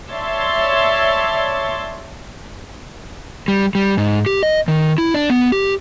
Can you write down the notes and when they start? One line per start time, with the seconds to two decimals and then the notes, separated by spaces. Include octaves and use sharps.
0.11 C#5 D5 E5 A5 C6
3.48 G3
3.75 G3
3.98 G#2
4.26 G4
4.43 D#5
4.68 D#3
4.98 E4
5.14 D4
5.30 B3
5.52 G4